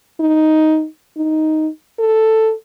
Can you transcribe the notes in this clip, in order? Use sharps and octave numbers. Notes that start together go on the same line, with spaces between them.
D#4
D#4
A4